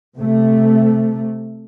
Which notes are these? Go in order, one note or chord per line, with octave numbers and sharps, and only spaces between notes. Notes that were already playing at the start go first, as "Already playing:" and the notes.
C3 A3